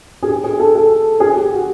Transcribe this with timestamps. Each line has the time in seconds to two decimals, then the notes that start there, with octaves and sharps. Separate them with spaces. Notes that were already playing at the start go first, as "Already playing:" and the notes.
0.22 G#4
0.28 G4
0.44 G#4
0.59 A4
0.75 A4
1.20 G#4
1.36 G4
1.52 F#4